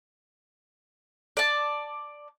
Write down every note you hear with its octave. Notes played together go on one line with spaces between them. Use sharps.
D5 A5